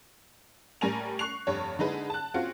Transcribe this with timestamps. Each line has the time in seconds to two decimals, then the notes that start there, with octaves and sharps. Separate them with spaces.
0.81 A2 G3 A#4 G#5 A#6 F7
1.19 C#6 F#6 C7 F7
1.47 F1 G2 C#5
1.79 D3 G#3 D#4 E4 G#4 B4
2.10 A5 F#6
2.34 C4 F4 F#4 G#4 C#7